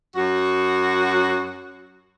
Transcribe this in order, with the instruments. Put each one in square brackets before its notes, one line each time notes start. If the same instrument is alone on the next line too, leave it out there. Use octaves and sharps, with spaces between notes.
[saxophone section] F#2 F#4